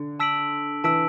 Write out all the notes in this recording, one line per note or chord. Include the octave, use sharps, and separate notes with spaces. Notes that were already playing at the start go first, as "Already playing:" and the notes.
Already playing: D3
A5 E6 B6 D7 F#7
E3 A5 E6 B6 D7 F#7